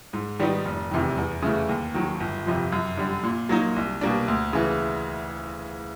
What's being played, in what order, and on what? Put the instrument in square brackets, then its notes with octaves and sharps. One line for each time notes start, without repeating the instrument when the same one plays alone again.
[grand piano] G#2
D#3 G3 B3 D#4
F1
E2 C3 D#3
E2
C#3 E3 A3
D#2
D#3 F#3
G1
F2 C3 F3
F#2
D3 G3
A#2
F#3 A#3 D#4
C2
B2 G3 A#3 D4
D2
C#3 E3